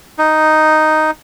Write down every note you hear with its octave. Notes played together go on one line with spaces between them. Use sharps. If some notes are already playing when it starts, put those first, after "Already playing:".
D#4